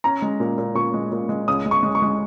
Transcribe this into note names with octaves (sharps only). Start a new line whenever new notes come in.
C#4 A#5
G#3
A#2
A#2
A#2 C#6
G#3
A#2
G#3
C#2 D#6
G#3
C#6
G#3
C#6
G#3